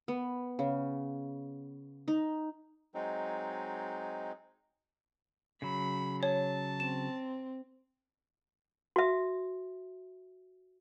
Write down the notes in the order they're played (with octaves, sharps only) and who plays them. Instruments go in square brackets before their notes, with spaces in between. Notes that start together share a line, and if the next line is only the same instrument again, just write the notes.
[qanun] B3
C#3
D#4
[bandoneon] F#3 G#3 C4 D#4
[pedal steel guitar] C#3 F#3 [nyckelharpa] B5
[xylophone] C#5 [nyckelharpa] A5
[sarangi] C4 [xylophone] E7
[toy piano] F#4 E5